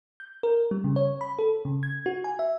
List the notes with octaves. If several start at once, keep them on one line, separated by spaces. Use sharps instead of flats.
G6
A#4
G3
C#3
C#5
B5
A4
C#3
G#6
F#4
G#5
E5